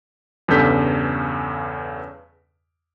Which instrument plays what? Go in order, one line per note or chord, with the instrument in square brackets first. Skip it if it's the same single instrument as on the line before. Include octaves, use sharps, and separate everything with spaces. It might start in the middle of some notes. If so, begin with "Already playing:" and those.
[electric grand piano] E2 G2 C#3 A4 G6 B6